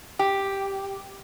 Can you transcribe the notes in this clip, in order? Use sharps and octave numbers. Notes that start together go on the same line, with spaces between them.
G4